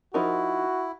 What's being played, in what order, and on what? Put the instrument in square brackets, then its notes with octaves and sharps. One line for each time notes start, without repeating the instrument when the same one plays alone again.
[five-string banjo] F3 D#4 A#4 [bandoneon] E4 [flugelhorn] F#4